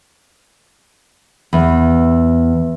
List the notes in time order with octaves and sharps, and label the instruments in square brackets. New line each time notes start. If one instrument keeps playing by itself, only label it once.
[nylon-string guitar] E2